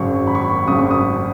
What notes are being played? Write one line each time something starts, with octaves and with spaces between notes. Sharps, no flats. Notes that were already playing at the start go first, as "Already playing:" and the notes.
Already playing: G#1 F#2 C#3 C#6
B5
C#6
B5
G#1 F#2 C#3 D#6
C#6
D#6